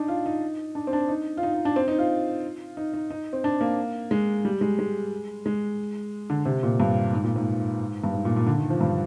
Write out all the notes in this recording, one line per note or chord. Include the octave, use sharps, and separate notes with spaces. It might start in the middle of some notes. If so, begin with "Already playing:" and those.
Already playing: D4 D#4
F4
D#4
D4
C4
D4
D#4
F4
D#4
D#4
D4
C4
D#4
F4
D#4
D#4
D#4
C4
D4
A#3
G#3
G3
G#3
G#3
G#3
D3
C3
A#2
G2
G#2
A#2
G#2
G2
G#2
A#2
A#2
D3
D#3
F3
G2